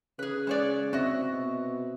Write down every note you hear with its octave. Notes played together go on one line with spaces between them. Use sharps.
C#3 G#4 B4
G#3 C#5 D5
C4 F#4 D#5 E5
B2